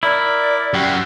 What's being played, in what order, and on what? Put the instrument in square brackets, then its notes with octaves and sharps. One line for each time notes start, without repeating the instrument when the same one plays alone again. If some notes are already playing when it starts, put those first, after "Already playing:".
[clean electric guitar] E4 [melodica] A#4 D6 [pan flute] D5
[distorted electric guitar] F#2 [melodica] F#4 G4